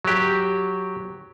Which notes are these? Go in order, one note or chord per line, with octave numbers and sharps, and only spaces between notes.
F#3 G4